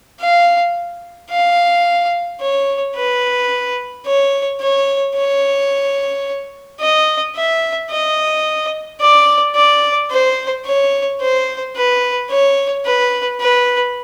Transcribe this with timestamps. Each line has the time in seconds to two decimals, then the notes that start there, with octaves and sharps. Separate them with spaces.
0.21 F5
1.31 F5
2.41 C#5
2.96 B4
4.06 C#5
4.61 C#5
5.15 C#5
6.80 D#5
7.36 E5
7.91 D#5
9.00 D5
9.56 D5
10.10 C5
10.65 C#5
11.21 C5
11.76 B4
12.30 C#5
12.85 B4
13.40 B4